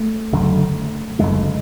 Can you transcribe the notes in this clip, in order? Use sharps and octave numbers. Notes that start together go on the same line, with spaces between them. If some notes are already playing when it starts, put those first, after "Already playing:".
Already playing: A3
F#1 F#2 D3
F#1 F#2 D3 G#3